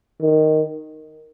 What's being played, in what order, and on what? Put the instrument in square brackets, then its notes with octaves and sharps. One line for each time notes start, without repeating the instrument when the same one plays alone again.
[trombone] D#3